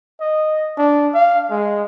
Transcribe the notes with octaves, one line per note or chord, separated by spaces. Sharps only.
D#5
D4
F5
G#3